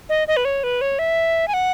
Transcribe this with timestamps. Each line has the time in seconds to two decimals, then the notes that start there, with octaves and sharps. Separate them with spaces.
0.09 D#5
0.28 D#5
0.37 B4
0.45 C#5
0.64 B4
0.81 C#5
0.99 E5
1.48 G#5
1.54 F#5